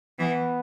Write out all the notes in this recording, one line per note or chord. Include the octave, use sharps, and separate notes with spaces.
E3 B3